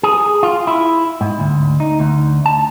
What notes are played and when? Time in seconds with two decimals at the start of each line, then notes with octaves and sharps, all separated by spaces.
0.03 G#4
0.43 F4
0.67 E4
1.21 G#2
1.40 D2
1.80 D#4
2.00 D2
2.46 A5